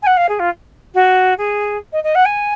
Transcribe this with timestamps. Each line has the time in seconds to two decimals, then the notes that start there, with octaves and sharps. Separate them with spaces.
0.02 G#5
0.06 F#5
0.17 F5
0.29 G#4
0.39 F4
0.94 F#4
1.38 G#4
1.92 D#5
2.03 D#5
2.15 F#5
2.25 G#5